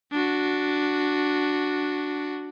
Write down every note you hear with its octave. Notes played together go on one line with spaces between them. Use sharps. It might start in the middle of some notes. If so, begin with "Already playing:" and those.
D4 F#4